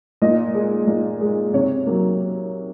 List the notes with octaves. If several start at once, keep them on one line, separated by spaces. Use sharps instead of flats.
A#2 D#5
G#3
A#2
G#3
C3 C#5
F#3 A#3